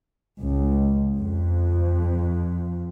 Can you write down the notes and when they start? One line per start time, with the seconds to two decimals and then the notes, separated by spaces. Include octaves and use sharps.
0.42 C#2
1.15 F2